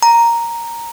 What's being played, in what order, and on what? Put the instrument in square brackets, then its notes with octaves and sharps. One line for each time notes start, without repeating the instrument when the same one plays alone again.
[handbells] A#5